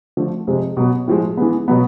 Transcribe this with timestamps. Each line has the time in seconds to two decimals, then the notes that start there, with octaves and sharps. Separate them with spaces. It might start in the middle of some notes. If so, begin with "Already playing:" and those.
0.17 D3 F3 A3
0.47 F2 C3 F3 G#3 C4
0.77 B2 F#3 B3
1.08 A2 F3 G#3
1.37 E3 G#3 B3
1.68 B2 F#3 B3